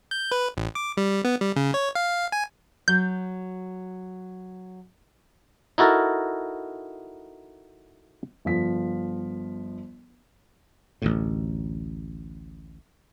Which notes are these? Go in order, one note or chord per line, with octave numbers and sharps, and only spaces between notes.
G6
B4
A1
D6
G3
B3
G3
C#3
C#5
F5
G#5
F#3 G6
D#4 E4 F#4 A4 A#4
G1 F3 B6
A1 D2 A2